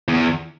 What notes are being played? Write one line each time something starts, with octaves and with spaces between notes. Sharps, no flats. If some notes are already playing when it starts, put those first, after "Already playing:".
E2